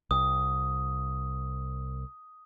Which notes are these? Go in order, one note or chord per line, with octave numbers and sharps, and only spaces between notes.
C2 D#6